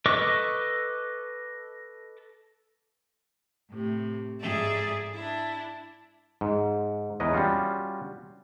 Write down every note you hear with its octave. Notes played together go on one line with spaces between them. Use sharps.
A4 B4 D#5 C#6 D6
A2 C3
G#2 G#4 A4 D5 E5
D4 E4
G#2
E2 A#4 B4 C#5 D#5
G3 C#4 F4 F#4